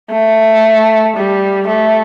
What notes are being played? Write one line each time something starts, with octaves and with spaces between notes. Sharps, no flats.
A3
G3
A3